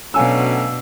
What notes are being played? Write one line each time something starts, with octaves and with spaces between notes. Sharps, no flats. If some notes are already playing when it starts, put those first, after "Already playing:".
B2 F#3 A3 C#4 D4 F5 G#5 E6